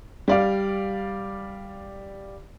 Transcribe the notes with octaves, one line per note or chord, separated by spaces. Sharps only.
G3 D5 F5